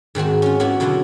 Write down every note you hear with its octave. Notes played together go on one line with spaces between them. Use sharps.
G#2 D#3 C4 F#4
C#4 F4
A#3 B3 C#4 E4 F#4 A#4
B2 D3 F#3 E4 F4 A#5